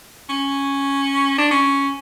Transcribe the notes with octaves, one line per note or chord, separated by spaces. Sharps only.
C#4
D4
C#4